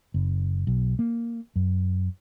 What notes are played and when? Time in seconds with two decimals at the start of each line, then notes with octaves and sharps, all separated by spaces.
0.14 F#1
0.67 B1
0.99 A#3
1.56 F#2